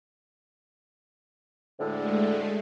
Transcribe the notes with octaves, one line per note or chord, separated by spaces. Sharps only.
D2 A2 D3 G#3 A3